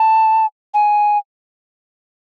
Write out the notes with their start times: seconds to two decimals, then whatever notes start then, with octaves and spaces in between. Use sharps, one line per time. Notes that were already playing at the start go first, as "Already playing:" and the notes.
Already playing: A5
0.74 G#5